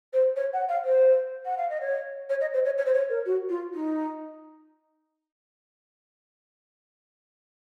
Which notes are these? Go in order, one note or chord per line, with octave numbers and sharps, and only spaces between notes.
C5
C#5
F#5
F5
C5
F#5
F5
D#5
C#5
C#5
D#5
C5
C#5
C#5
C5
C#5
A#4
F#4
F4
D#4